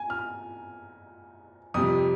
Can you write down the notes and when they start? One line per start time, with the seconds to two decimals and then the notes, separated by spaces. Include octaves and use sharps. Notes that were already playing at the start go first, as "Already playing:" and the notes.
Already playing: G#5
0.10 F6
1.74 F2 C3 G3 D#6